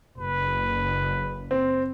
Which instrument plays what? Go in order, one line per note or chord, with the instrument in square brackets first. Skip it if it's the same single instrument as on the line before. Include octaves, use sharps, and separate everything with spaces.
[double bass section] F#1 [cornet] B4
[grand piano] C4